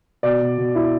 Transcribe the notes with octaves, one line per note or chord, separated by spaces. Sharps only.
B2 D5
B2
B2
E4